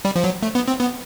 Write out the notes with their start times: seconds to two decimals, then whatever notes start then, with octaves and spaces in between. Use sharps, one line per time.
0.05 G3
0.16 F3
0.24 F#3
0.43 A3
0.55 B3
0.68 C4
0.80 B3